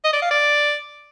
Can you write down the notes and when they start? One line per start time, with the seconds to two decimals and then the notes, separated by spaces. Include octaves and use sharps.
0.04 D#5
0.13 D5
0.22 F5
0.31 D5